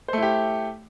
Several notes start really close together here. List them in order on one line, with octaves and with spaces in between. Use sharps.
C5 A3 E4 G4